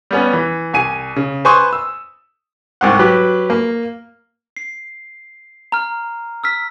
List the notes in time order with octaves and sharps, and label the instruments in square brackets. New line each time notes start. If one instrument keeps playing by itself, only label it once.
[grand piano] G3 B3 C#4
E3
C2 G#5 D#7
C#3
B4 C5 G#5 C6 C#6 D#6
E6
[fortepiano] C2 G#2 F#5
F#3 G4 B4
A#3
[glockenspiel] C7
A#5 F6
E6 F6 B6